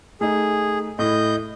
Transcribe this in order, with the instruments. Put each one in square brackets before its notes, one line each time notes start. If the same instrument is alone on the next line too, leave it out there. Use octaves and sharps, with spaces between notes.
[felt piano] A3 D#4 [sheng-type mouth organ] G#4
[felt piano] A2 E4 [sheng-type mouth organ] D#5 G6